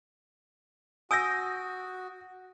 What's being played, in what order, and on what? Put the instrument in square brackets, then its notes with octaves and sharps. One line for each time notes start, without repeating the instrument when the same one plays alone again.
[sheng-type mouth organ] F#4 [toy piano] G#5 E6 [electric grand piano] D#6 G6 A#6